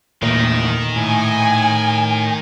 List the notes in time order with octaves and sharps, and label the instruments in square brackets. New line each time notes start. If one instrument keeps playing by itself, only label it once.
[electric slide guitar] E2 A3 A#3 [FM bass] A#2 [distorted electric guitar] D#3
[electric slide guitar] A2 [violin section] G#5